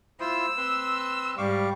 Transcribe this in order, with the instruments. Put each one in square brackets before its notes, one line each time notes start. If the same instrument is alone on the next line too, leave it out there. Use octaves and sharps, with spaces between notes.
[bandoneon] E4 F4 C5 [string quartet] E6
[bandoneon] C4 B4 C6
[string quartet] G#2 [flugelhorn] G3 [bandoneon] F5 C#6 D6